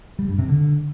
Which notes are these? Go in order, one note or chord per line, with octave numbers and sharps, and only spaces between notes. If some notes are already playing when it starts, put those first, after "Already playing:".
G3
G2
C3
D3